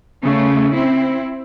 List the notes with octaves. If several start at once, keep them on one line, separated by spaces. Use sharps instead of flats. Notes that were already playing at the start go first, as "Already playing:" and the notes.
C#3 A3
C4 E4